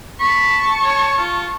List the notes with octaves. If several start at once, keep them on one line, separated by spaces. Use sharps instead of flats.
A5 B5 C#6
C#5
F4